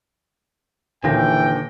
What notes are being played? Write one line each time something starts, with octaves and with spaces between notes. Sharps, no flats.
D#2 A#2 D3 E3 G5 A#6